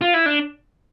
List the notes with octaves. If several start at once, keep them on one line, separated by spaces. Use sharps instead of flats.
F4
E4
D4